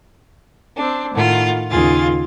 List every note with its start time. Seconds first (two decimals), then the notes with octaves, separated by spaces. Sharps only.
0.76 C4 D4
1.13 A2 D#3 F4 F#5
1.70 D#2 C#3 F4 G#4 A6